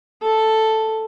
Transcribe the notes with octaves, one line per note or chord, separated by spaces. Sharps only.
A4